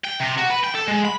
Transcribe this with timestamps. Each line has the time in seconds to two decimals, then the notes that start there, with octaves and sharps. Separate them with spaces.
0.04 G5
0.20 C3
0.37 F#4
0.50 B4
0.64 G5
0.75 A4
0.88 G#3
1.05 B5